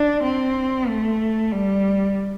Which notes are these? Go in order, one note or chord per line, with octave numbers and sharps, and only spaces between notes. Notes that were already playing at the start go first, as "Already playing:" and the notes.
Already playing: D4
C4
A3
G3